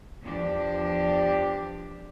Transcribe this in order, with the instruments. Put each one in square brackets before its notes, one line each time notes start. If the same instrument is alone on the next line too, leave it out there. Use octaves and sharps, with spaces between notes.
[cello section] E2 F3 D4 G4